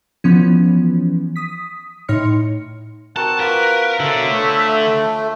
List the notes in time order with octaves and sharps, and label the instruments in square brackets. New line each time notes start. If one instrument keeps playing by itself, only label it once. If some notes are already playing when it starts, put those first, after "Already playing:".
[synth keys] E3 F3 B3 C#4
D#6 B6
A2 D#4 C#5 C6 F6 C#7
[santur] C4 F#4 A#4 [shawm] F#5 [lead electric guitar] A5
[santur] A#3 F4 [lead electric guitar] A#4 [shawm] B4
[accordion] B2 [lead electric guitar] D3 [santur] A4 C5 C#5 [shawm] E5
[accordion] A3